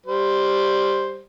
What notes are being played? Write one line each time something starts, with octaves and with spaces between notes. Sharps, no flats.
G3 C5